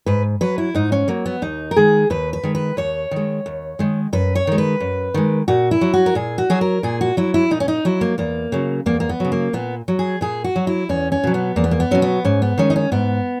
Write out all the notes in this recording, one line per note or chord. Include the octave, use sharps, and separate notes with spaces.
G#2 B4
F#3 B4
E4
G#2 D#4
C#4
F#3 A#3
B3
D#2 D#4
A#4
D#3 G#3 G#4
D#2 B4
B4
D#3 G#3
B4
D#2 C#5
D#3 G#3
D#2
D#3 G#3
F#2 B4
C#5
D#3 G#3
B4
F#2
D#3 G#3
A#2 F#4
E4
F#3
F#4
A#4
A#2 G#4
F#4
F#3 G#4
A#4
A#2 G#4
F#4
F#3 E4
E4
A#2 D#4
C#4
D#4
F#3 E4
A#3
E2 A#3
C#3 F#3
E2 A#3
A#3
B3
C#3 F#3
A#3
A#2 B3
F#3
G#4
A#2 G#4
F#4
F#3
E4
E2 C#4
C#4
B2 F#3
B3
E2 A#3
B3
A#3
B3
B2 F#3 C#4
B3
G#2 C#4
B3
D#3 G#3 C#4
D#4
C#4
G#2 B3